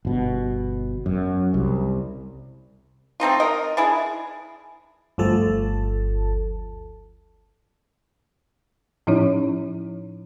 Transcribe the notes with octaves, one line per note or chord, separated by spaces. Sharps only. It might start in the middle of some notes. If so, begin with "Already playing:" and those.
G1 B2
F#2
C2
A3 C4 D#4 F4
A#4 D#5
D4 E4 G#4
G1 D2 F3 A4 A5
A2 F3 C#4 D#4 E4 C#5